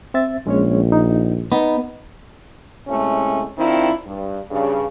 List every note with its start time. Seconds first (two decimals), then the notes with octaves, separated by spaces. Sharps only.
0.14 C4 E5 A6
0.47 A#1 G#3 C#4 C#5
0.92 D#4
1.52 B3 D#4 B5
2.88 A2 C3 G#3 A3 C#4
3.58 D#3 C4 D4 E4 F4
4.07 G2
4.51 G2 C#3